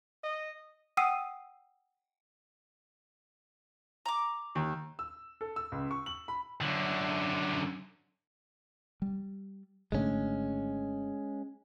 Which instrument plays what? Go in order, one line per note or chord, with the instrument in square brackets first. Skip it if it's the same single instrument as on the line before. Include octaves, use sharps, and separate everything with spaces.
[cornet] D#5
[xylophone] F#5 G5 D#6 E6 C7 D#7
[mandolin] A#5 D6
[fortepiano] D#2
[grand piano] E6
A4
E6
C#2
C#6
F#7
B5
[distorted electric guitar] F#2 D3
[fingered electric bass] G3
[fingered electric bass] G#1 D3 A3 [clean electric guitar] G#3 C#4